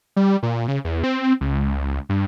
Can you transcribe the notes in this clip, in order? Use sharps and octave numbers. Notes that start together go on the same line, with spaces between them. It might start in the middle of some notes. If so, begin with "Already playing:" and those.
G3
A#2
C#3
E2
C4
C#2
G2